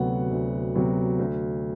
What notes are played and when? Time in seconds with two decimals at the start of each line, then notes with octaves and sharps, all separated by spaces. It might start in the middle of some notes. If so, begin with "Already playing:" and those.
Already playing: D2 C3 F#3 B3 F#5
0.31 D2
0.75 C3 F#3 B3
1.19 D2